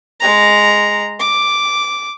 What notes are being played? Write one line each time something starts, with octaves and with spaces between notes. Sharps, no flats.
G#3 A#5
D6